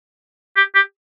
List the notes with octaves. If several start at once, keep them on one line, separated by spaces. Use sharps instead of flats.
G4
G4